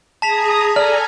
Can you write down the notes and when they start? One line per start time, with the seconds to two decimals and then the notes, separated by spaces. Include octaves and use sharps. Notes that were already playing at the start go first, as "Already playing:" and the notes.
0.22 G#4 A5 A#5 D#6 B6 F7
0.76 A4 D5 G#5 A#5 F6